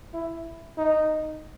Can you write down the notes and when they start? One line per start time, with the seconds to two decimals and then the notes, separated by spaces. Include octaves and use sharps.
0.13 E4
0.78 D#4